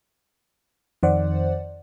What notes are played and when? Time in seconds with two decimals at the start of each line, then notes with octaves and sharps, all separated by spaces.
1.03 F2 D#3 C5 D5 F#5